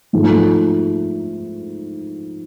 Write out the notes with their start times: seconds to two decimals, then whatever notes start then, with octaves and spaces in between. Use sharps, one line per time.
0.13 G#2 F3 A3